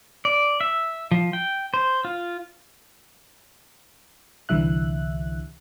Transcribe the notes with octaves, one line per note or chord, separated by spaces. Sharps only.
D5
E5
F3
G5
C5
F4
C2 D3 E3 G3 E5 F#6